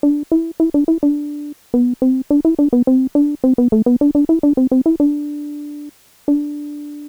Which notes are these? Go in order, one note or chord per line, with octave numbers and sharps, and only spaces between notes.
D4
E4
E4
D4
E4
D4
B3
C4
D4
E4
D4
B3
C4
D4
C4
B3
A3
B3
D4
D4
E4
D4
C4
C4
E4
D4
D4